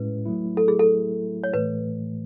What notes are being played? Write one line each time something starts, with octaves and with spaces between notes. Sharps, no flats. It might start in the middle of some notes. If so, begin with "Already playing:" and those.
Already playing: A2 G#3 C#4 E4 B4
F#3 A3 E4
A4
G#4
A4
C#5
A2 E3 A3 B4